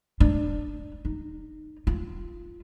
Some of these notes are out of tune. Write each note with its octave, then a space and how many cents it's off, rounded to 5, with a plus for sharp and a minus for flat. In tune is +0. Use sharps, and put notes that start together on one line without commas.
D4 +15
D#4 -15
F4 -15